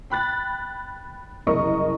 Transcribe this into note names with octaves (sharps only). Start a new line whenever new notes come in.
G5 B5 F#6 A6
F#1 C2 E3 A#4 D#5 C#6